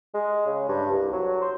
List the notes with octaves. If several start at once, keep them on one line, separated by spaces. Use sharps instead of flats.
G#3
C#3
G2
C2
F#3
C5